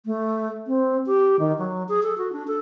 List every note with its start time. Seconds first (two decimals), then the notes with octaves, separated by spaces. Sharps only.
0.06 A3
0.67 C4
1.06 G4
1.39 D#3
1.58 F#3
1.89 G#4
2.03 A4
2.18 F#4
2.33 D4
2.47 A4